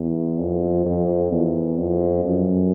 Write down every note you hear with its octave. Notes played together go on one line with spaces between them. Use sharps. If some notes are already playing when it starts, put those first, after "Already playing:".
Already playing: E2
F2
F2
E2
F2
F#2